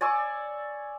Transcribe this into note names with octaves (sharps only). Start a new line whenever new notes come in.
D5 G#5 C#6 E6